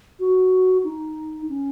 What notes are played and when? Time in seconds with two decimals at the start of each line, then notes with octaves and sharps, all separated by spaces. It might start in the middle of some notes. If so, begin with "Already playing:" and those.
0.20 F#4
0.84 D#4
1.49 C#4